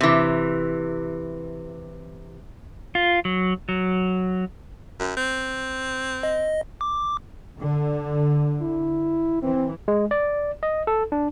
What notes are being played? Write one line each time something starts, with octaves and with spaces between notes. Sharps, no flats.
C3 E3
F4
F#3
F#3
F#2
C4
D#5
D6
D3
E4
E3 C4
G#3
D5
D#5
A4
D4